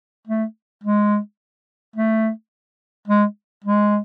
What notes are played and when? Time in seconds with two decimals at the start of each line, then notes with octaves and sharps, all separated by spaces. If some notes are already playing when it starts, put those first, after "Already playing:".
0.28 A3
0.84 G#3
1.96 A3
3.08 G#3
3.64 G#3